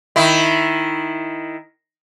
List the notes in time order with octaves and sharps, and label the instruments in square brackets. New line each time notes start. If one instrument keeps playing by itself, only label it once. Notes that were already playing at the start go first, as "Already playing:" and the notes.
[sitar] D#3 E4